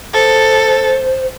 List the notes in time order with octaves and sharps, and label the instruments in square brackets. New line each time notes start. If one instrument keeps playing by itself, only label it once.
[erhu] A4 [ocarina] C5